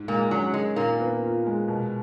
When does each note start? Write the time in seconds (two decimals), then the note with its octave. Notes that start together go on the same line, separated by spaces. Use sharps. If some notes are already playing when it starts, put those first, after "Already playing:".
Already playing: G#2
0.08 A#2 G#3 A#3
0.31 F#3 C#4
0.54 D#3 G#3
0.76 A#2 D#3 A#3
1.00 B3
1.22 F4
1.46 G#3
1.68 B2